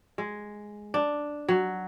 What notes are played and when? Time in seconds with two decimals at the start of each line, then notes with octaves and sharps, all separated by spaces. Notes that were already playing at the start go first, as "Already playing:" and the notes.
0.18 G#3
0.94 D4
1.49 F#3